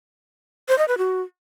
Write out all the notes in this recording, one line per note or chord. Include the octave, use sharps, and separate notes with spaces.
C5
D#5
B4
F#4